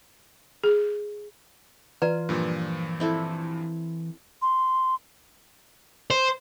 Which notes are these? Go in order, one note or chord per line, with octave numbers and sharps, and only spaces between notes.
G#4
E3 F4 B4 D5 A#5
G2 A#2 F3
C4 E4 A4
C6
C5